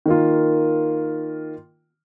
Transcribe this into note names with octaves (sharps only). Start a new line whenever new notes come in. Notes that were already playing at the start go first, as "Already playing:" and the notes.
D#3 A#3 F4